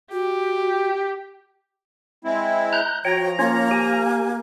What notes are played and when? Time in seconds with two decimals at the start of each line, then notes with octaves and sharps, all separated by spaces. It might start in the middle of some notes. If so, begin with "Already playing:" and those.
0.12 F#4 G4
2.25 G#3 C4 E4
2.73 A#5 F#6 G6
3.05 F3 F#4 C#5 G5 A#5
3.39 A#3 C#4 F4 C#5
3.71 G4 G#5